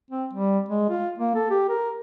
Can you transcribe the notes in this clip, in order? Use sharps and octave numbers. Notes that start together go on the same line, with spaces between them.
C4
G3
G#3
F4
A#3
A4
G4
A#4